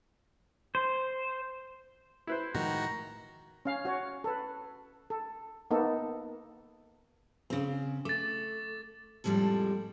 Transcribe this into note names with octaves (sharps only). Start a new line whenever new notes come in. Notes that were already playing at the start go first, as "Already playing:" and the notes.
C5
E4 B4 C5
A2 D#3 F3 G#3 F#4 A#5
C#4 F5
F#4 C#5
A4 B4
A4
A#3 B3 D#4 A4
C#3 C4
A3 D6 A6
F2 A2 G3 G#3 A4